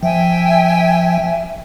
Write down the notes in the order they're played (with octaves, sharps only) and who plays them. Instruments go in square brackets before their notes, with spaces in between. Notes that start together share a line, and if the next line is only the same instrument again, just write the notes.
[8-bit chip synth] F3 [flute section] E5 G5 G#5